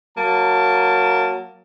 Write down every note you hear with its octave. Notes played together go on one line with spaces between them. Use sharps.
F#3 A#3 A5